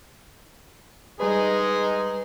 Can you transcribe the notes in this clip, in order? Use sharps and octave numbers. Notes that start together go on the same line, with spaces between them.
G3 G#3 D#4 G#4 B4